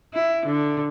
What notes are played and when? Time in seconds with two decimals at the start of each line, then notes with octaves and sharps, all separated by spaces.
0.14 E4
0.46 D3